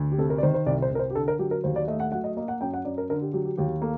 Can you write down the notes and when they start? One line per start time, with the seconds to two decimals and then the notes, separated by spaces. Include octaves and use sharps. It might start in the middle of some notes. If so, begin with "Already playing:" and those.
Already playing: D2
0.12 G4
0.18 C3 A4
0.30 A#4
0.38 D5
0.43 D#3 C5
0.54 C5
0.66 C2 D5
0.82 C5
0.91 C2 A#4
0.99 C5
1.10 G4
1.15 D3 A4
1.28 A#4
1.39 F#3 G4
1.51 A#4
1.64 D#2 C5
1.76 D5
1.88 A3 D#5
2.00 F#5
2.12 F#3 F#5
2.24 D#5
2.37 A#3 D#5
2.48 F#5
2.61 F#2 G5
2.74 F#5
2.85 F#2 D5
2.98 A#4
3.10 D3 A#4
3.22 G4
3.33 F#3 G4
3.45 G4
3.57 D#2 G4
3.82 A#3 A4